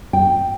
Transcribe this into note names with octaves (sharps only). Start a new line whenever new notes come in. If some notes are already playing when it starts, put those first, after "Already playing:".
G5